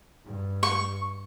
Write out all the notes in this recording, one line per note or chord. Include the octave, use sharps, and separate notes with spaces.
G2
C#6